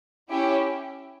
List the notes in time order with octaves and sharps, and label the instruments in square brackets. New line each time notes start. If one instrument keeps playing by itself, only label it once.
[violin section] C#4 E4 G4